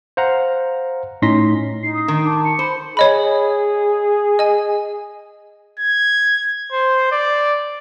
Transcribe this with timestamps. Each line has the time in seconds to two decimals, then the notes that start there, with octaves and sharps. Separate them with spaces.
0.17 C5 F5 F#5 A#5
1.22 A2 C#4 D#4 C6 A#6 B6
1.83 D#4 C7
1.94 D#6
2.08 D#3
2.25 A5 D6
2.45 C#7
2.59 C5 B5
2.97 G#4 C#5 D#5 B5
4.39 D#5 G#5
5.80 G#6
6.72 C5
7.12 D5